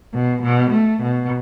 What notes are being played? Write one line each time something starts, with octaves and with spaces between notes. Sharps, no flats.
B2
B2
A3
B2